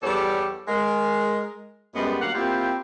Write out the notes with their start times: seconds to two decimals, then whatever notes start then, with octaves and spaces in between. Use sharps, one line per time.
0.03 E2 G3 G4 A4 C#5 D5
0.68 G#3 A#4
1.96 F#2 G3 G#3 B3
2.21 D2 F#3 A#3 F5 F#5
2.34 A#3 C4 E4 F4 G4